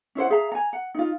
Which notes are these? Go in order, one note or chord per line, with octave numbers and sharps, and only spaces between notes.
C#4 E4 C5 F#5
G#4 E5 F5 A#5
G#5 A#5
F#5
D#4 F4